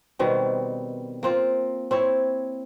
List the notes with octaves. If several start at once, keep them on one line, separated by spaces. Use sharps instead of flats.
B2 D#3 G3 C4
A#3 C4 F4
C4 E4 C#5